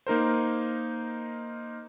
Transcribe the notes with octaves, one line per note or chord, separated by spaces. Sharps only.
A#3 D#4 A#4 C5